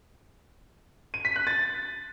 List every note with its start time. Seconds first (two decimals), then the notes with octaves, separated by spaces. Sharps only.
1.14 D#7
1.25 B6
1.36 F#6
1.47 A6